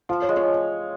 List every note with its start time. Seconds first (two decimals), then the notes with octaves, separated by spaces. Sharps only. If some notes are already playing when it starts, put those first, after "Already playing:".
0.09 F3 F5
0.22 C#5
0.29 G#3
0.37 C#5